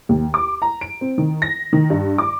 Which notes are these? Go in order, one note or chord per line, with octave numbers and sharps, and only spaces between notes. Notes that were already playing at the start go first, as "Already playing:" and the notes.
D#2
D6
A#5
D7
C4
D#3
A#6
D#3
G2
D6